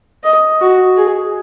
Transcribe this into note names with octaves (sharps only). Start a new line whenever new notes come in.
D#5
F#4
G#4